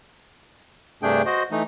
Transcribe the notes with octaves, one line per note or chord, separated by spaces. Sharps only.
G2 C3 A3 D4 G#4 G5
F#4 C5 D#5
E3 A3 D#4